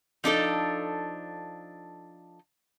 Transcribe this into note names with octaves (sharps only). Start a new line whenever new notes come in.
F3 D4 D#4 A4